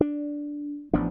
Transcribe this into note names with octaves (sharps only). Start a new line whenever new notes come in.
D4
A1 F3 B3 D4